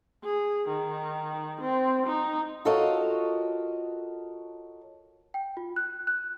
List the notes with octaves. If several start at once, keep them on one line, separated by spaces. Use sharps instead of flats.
G#4
D#3
C4
D#4
F4 F#4 A4 A#4 C#5 D#5
G5
F4
F#6
F#6